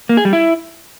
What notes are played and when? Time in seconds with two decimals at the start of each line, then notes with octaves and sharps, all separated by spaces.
0.09 A#3
0.17 G#4
0.25 G3
0.33 E4